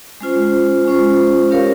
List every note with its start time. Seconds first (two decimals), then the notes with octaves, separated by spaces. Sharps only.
0.21 G#3 C#4 F4 C5
0.85 G#3 C#4 F4 C5
1.51 C#4 G4 A#4 C#5 F5